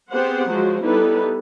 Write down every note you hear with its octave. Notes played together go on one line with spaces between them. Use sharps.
B3 C4 G4 G#4 C5 F#5
F3 F#3 G#3 F#4 C5
G3 B3 D#4 E4 A4 B4